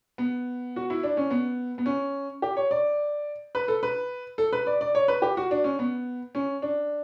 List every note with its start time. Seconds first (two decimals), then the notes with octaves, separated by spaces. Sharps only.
0.18 B3
0.76 F#4
0.90 E4
1.03 D4
1.17 C#4
1.30 B3
1.78 B3
1.86 C#4
2.42 G4
2.57 C#5
2.71 D5
3.55 B4
3.68 A4
3.83 B4
4.38 A4
4.53 B4
4.67 D5
4.81 D5
4.95 C#5
5.08 B4
5.22 G4
5.37 F#4
5.51 D4
5.64 C#4
5.79 B3
6.35 C#4
6.62 D4